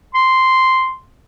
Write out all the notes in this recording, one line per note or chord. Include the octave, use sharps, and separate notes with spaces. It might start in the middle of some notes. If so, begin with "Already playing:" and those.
C6